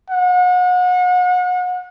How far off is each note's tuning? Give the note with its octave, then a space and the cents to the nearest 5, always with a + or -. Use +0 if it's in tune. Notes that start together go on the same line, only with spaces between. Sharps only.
F#5 -35